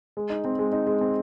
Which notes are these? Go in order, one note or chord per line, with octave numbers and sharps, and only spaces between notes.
G#3
D#4
C4
G#3
D#4
G#3
C4